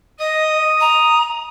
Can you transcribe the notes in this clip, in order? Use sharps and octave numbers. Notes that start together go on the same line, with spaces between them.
D#5 D#6
A#5